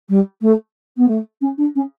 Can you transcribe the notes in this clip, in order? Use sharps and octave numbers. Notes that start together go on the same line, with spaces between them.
G3
A3
B3
A3
C#4
D4
C#4